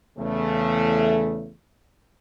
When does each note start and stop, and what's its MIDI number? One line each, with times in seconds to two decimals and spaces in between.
0.18 1.51 40
0.18 1.51 49
0.18 1.51 57